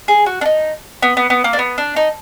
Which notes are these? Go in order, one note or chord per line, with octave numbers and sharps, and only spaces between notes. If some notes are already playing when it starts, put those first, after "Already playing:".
G#4
F#4
D4
D#4
B3
B3
B3
A#3
D4
B3
D4
D#4